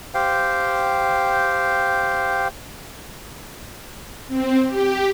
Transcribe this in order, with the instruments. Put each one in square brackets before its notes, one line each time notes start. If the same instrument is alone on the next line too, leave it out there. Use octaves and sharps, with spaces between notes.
[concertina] G4 C5 F5 G5
[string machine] C4
G4